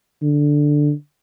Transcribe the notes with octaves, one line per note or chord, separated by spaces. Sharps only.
D3